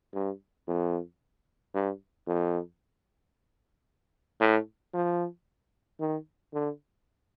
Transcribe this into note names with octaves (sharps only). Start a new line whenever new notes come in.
G2
F2
G2
F2
A2
F3
D#3
D3